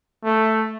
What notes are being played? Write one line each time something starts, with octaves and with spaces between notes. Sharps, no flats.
A3